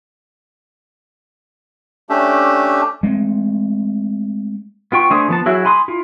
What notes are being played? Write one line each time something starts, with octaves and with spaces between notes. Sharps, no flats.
A3 C#4 D4 G4 E5
G#3 A3 B3 C4
B3 F4 G5 C#6
D3 A3 C5 G#5 D#6
F3 B3 A5
F#3 E4 F#4 G#4 E5
G#5 B5 C6 D6 D#6
E4 F4